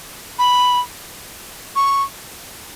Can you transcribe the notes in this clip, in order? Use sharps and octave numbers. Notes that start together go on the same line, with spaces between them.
B5
C#6